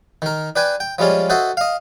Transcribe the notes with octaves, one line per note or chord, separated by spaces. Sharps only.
D#3 A#4
D4 B4 G5 G#5
G5
F3 G3 G#3 C#4 F4
F#4 A4 C5 D#5 E5
D#5 F5